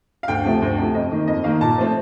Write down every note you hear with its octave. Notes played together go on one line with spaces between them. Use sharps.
F5
D2 G5
C3 F3 A3
D2 G5
C3 F3 A3
F2 D#5
D#3 A#3
F2 D#5
D#3 A#3 F5
A#2 A5
F3 A3 C4